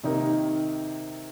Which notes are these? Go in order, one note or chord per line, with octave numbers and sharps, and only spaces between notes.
C3 D#3 A#3 D#4